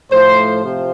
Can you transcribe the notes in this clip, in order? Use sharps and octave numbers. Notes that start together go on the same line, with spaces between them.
A2 F3 A3 C5
C3 F3